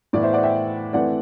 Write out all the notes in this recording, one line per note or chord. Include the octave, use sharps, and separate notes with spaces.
A2 E3 B3 E4 D5
C5 E5
D5 F#5
E5 G5
E3 A3 C4 E4 D5 F#5